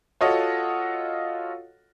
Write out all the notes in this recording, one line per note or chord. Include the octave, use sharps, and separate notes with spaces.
F4 F#4 A4 C#5 D#5 F#5